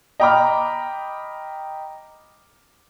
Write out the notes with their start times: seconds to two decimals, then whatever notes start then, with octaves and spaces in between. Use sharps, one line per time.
0.20 D#5 G5 A#5 B5 D6 F6